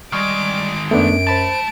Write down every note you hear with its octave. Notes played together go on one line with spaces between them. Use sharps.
D#3 G3 G#3 C#6 D6 F6
F#2 A3 B3 D4 D7
A3 C5 A5 B5 A6